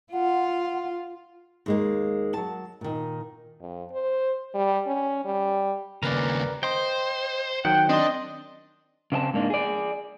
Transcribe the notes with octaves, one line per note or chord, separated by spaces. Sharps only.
F4 F#5
D#2 G#3 A#3
F#3 A5
A#2 D#3
F2
C5
G3
C#4
G3
D#2 C#3 A#4 B4 D5 A#5
C5 D#5 G5 C6
D#3 F#3 F#5 G5
C4 D4 D#5 C6
C#3 C4 D#5 A5
G#2 A#3 D4
G#4 D5